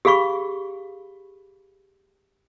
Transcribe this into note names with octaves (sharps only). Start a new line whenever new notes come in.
G4 G#4 F5 B5 C#6